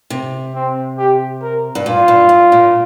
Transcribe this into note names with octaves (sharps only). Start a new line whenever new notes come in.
C3
C4
G4
A#4
G2
A#2 F4
G2
G2
A#2